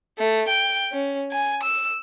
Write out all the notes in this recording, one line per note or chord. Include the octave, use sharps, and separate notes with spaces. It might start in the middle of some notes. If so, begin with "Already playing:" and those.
A3
G5
C#4
G#5
E6